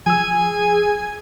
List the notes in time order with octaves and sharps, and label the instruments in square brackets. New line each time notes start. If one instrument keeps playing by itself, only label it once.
[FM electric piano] F3 E6 [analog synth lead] G#4 [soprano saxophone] G#5